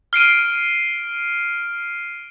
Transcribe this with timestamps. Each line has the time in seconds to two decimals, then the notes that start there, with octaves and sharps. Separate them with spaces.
0.13 F6 C7 D7 D#7